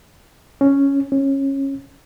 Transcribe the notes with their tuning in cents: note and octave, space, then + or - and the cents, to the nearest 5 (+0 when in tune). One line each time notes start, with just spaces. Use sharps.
C#4 +0
C#4 -20